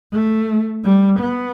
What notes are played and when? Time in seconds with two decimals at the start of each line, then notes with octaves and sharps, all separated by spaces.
0.13 A3
0.84 G3
1.19 B3